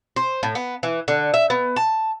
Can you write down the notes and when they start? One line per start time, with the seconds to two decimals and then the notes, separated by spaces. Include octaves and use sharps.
0.16 C5
0.43 A2
0.55 B3
0.83 E3
1.08 D3
1.34 E5
1.50 B3
1.76 A5